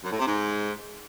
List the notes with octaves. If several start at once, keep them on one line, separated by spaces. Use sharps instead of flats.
F#2
A2
C3
G#2